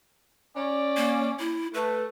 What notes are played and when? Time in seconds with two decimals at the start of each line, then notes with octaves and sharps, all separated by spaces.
0.56 C#4 D5
0.97 A#3
1.39 E4
1.74 A3 B4